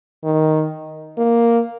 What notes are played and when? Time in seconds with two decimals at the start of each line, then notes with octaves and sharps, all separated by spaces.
0.24 D#3
1.17 A#3